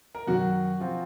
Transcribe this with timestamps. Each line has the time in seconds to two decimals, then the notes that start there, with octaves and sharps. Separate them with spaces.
0.15 A#4 A#5
0.27 F#2 D#3 F#3 F#4 F#5
0.80 F3 C4 F4